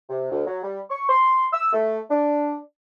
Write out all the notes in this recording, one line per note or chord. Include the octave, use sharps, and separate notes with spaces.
C3
D2
F#3
G3
C#6
C6
E6
A3
D4